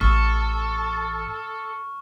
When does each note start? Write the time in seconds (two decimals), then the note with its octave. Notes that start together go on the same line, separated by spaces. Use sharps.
0.01 A1 A4 C#6 F6